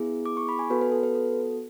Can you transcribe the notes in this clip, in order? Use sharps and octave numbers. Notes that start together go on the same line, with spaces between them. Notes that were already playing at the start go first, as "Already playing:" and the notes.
Already playing: B3 E4 G#4
D6
C#6
B5
G#5
B3 F#4 A4 B4
B4
A4
B4
A4